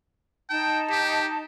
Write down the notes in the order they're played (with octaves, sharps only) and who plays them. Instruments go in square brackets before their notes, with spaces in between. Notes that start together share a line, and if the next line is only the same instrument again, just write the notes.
[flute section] D#4 A5 [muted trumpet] G5
[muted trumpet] G4